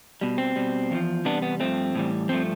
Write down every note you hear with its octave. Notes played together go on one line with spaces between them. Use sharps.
B2 G3
C4
B2 G3
E2 D3 F3
E2 C3 G3 B3 D4
B3
G2 F3 A3 C4
A2 E3 G3
G2 F3 A3 C4